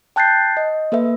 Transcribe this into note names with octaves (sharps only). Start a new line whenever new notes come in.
G5 A5 F#6 G6 A6 C7
D#5
A#3 A4 B4 E5